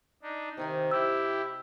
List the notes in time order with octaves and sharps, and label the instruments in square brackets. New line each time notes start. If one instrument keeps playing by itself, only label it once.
[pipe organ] D4 D#4
[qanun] C3 D#4 G#5 [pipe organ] D#3
[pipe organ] E4 G4 [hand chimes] E6